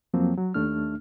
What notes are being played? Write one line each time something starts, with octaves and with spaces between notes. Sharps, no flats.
F2 F3 F#3 A#3 C4
F#3
D#2 A3 D4 F6